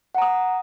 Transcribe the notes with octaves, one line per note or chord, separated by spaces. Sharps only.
F#5 A#5 D#6